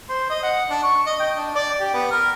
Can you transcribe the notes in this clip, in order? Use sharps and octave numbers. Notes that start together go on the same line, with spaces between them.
C5
D#5
F#5
D4
C#6
D#5
G5
D4
D5
G4
B3
A#4